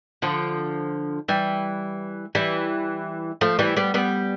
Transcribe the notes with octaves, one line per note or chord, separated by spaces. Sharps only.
D3 F3
E3 G3
E3 G3
F3 A3
E3 G3
G3 B3
G3 B3